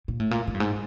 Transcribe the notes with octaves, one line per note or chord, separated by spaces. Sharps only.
A#2
A2
A#2
A2
G2
G#2